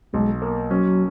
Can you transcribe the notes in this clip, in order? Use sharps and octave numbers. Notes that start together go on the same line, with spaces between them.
B1 G#3
A#3
F#3 C#4